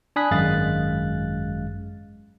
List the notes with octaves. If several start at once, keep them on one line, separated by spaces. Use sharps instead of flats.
D4 G#5 B5 D#6 F#6 B6
G#1 F#2 G#3 F5 F#6 A6